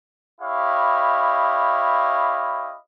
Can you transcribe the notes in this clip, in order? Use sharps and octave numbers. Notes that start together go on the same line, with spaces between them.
E4 G4 C#5 D#5 F5 B5